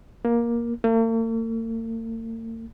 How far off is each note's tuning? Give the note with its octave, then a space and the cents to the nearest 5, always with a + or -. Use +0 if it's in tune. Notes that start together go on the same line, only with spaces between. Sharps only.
A#3 +15
A#3 -45